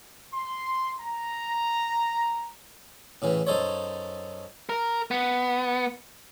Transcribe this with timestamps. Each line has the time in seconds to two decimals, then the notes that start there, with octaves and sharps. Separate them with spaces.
0.33 C6
1.00 A#5
3.22 A2 C#3 E3
3.47 F#2 D#4 A4 C5 C#5
4.69 A#4
5.11 B3